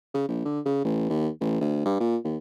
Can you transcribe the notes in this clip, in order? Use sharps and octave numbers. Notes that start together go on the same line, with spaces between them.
C#3
A#1
D3
C#3
A1
D#2
A1
D2
G2
A#2
D#2